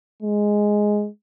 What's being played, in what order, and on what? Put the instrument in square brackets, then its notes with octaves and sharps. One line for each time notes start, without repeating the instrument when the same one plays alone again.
[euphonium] G#3